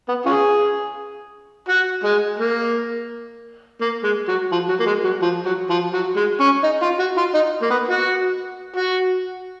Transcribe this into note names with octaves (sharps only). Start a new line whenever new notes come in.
B3
C#4 F4 G#4
F#4
G#3
A#3
A#3
G#3
F#3
F3
F#3
A#3
G#3
F#3
F3
F#3
F3
F#3
G#3
C#4
D#4
F4
F#4
F4
D#4
A#3
B3
F#4
F#4